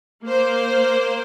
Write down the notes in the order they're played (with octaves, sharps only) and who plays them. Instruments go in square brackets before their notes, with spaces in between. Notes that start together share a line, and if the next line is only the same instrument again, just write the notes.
[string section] A#3 C5